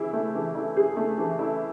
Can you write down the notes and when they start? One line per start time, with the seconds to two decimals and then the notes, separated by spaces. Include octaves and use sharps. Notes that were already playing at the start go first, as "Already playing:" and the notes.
Already playing: E3 E4 G#4
0.13 A3
0.35 E3
0.55 E4
0.77 G#4
0.97 A3
1.18 E3
1.39 E4